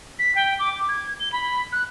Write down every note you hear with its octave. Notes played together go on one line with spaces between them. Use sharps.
B6
G5
D6
G#6
G7
B5
F#6